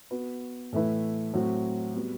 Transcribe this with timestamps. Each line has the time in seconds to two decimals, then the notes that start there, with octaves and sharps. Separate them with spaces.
0.11 B3 F#4 B4
0.73 A2 E3 A3 E4 B4
1.33 A2 F#3 C4 F#4
1.94 G3 B3 F#4